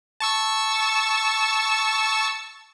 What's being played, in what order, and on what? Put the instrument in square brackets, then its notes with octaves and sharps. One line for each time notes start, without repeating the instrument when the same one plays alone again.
[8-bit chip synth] A5 C#6 E6